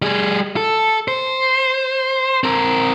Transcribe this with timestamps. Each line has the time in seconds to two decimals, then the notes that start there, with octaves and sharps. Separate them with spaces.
0.02 G3 G#4
0.57 A4
1.08 C5
2.44 C4 A#4